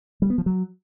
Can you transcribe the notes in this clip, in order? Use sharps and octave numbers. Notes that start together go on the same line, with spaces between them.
G3
B3
F3
F#3